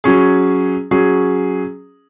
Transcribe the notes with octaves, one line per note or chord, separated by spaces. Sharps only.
F#3 C#4 G#4
F#3 C#4 G#4